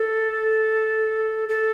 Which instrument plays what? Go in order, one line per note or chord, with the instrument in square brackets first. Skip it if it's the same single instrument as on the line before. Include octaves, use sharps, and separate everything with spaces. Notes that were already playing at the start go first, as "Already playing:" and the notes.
Already playing: [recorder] A4
A4